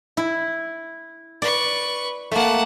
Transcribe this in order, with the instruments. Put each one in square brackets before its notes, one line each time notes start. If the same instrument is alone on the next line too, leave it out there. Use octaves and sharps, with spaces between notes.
[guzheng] E4
[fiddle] B4 C#6 [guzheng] D5
[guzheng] A3 A#3 [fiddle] F#5 A5